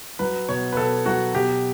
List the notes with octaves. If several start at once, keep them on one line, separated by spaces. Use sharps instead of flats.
F#3 B4
B2 C#5
B4
B2 A4
F#3 F#4
B2 G4